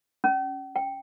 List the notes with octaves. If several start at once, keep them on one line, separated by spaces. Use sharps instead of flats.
C#4
G5